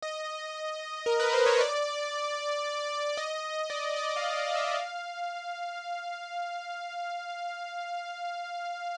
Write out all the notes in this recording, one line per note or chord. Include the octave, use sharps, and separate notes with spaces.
D#5
A#4
B4
C5
C#5
D5
D#5
D5
D5
F5
F5
E5
F5